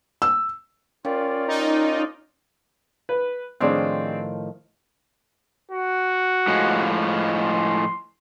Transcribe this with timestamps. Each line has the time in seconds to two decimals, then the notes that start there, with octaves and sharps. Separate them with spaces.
0.22 E6
1.05 C#4 F4 A#4 D5 F5 G5
1.48 D#4
3.09 B4
3.60 A2 D#3 F3 C4 D4 G#4
5.71 F#4
6.47 A2 F3 G#3
7.38 C6